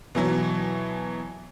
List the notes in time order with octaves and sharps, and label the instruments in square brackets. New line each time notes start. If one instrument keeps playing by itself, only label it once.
[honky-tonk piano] B2 E3 F#3